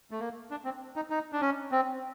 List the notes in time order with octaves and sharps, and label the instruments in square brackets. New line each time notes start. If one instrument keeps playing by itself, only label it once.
[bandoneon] A3
A#3
D4
C4
D#4
D#4
D4
C#4
C4